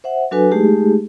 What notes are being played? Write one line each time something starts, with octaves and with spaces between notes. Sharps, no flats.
C5 E5 F#5
F#3 D4 F#4 A4 B4 G#5
G#3 A3 D#4 G4 G#4